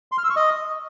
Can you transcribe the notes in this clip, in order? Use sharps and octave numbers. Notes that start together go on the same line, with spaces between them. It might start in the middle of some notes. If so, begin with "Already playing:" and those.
C6
F6
E6
C#6
D#5